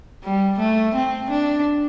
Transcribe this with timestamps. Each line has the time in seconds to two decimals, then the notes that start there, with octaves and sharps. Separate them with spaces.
0.24 G3
0.59 A3
0.95 C4
1.30 D4